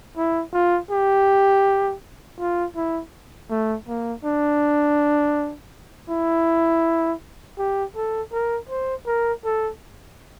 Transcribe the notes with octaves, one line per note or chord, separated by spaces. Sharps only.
E4
F4
G4
F4
E4
A3
A#3
D4
E4
G4
A4
A#4
C5
A#4
A4